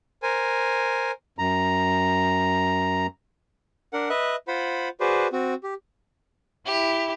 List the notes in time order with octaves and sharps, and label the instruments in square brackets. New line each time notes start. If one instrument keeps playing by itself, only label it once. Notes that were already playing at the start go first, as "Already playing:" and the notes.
[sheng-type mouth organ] A#4 C5 G#5
[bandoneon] F#2 A#5
[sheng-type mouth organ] D4 A#4 F#5
B4 D#5 E5 F#6
F4 C5 F#5 B5
F#4 G#4 B4 C5 D5
C4 F#4
G4
[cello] E4 [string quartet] G4